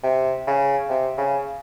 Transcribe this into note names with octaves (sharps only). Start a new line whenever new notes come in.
C3
C#3
C3
C#3